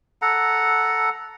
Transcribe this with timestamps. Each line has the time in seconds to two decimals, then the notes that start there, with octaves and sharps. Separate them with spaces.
0.22 A4 F#5 A#5